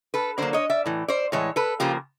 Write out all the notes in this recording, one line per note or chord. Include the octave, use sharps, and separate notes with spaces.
A4 B4
D3 F#3 A#3 C5 D5
C#5 D#5
D5 E5
A2 E3
C5 D5
A2 E3 G#3 C#5
A4 B4
C#3 F3 A#3 F4 G4